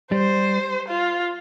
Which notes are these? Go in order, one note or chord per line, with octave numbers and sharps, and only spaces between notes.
G3 C5
F4